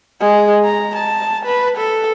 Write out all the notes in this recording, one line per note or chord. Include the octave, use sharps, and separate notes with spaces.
G#3
A#5
A5
B4
A4